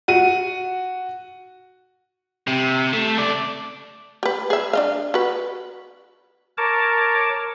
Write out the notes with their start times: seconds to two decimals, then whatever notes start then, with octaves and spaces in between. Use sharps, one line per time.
0.08 F#4 D#7
2.47 C3
2.93 A3
3.18 C#3 D5
4.23 G4 B4
4.50 G#4 E5
4.73 D4 D#5 F5
5.14 F#4 B4
6.58 A#4 C#5 A5 D6